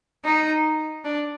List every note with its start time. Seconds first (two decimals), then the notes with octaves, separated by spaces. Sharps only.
0.25 D#4
1.05 D4